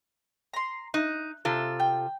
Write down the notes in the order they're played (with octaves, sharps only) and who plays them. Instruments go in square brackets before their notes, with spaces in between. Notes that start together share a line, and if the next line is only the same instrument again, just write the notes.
[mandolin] A#5 C6
[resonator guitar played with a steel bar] D#4 [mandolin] F#6
[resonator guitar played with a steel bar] C3 F4 A4
[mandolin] G5